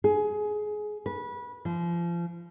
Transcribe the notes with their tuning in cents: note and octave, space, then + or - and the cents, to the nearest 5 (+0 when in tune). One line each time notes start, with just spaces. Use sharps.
G#4 +20
B4 -20
F3 -30